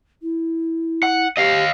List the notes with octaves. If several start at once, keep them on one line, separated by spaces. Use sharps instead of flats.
E4
F#5
G4 D#5 F5